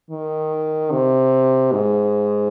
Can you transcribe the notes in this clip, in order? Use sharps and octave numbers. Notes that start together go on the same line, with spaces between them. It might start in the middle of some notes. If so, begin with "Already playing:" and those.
D#3
C3
G#2